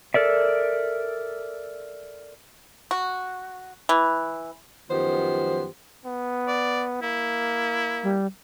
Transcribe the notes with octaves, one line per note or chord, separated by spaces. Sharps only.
A4 A#4 D5 E5
F#4
E3
F#2 D#3 F3 B3 G4 C5
B3
D5
A#3 E4
G3